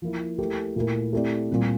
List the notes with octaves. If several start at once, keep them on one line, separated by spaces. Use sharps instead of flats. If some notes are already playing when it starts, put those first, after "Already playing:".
F3 A#3 E4
A3 E4 G4 A#4
A#2 A3 E4 A#4
A3 C4 E4 G4 D5
A#2 G3 C4